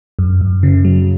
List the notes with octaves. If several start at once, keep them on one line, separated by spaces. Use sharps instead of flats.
F#2
F#2
C#3
F#3